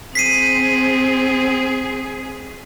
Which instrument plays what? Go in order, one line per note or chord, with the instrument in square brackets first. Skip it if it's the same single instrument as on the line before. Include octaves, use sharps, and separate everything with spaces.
[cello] C4 G#4 [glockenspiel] B6 C7 D#7